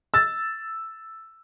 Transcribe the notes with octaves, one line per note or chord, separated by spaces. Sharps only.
E6 A6